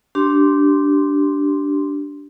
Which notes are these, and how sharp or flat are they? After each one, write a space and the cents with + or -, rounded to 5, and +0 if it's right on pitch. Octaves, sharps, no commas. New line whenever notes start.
D4 -10 G4 -20 C6 +0